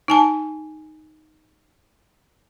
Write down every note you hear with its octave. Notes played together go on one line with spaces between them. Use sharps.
D#4 G#5 A5